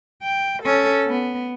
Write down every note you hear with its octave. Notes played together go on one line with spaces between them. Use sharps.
G5
C#4 A4
B3